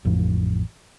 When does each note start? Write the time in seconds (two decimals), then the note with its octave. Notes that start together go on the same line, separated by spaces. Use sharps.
0.05 A1 F2